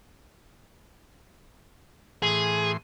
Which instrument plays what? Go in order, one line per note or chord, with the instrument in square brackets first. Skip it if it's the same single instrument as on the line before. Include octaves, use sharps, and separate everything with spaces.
[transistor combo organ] A2 E3 C6 [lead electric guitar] G#4